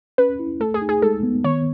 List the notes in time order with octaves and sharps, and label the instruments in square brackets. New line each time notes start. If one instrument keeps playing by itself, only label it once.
[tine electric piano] C#4 [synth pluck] B4
[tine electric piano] E4
[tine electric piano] A3 [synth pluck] A4
[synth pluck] G#4
[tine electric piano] D#4
[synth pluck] G#4
[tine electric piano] G#3 [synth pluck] A4
[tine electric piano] B3
[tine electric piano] D#3 [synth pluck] C#5